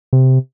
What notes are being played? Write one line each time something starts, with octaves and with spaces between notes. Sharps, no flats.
C3